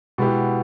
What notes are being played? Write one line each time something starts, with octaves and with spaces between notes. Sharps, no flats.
B2 G#3 B3 E4 G4